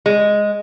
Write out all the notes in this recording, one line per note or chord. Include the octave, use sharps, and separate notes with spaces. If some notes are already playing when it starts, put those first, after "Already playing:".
G#3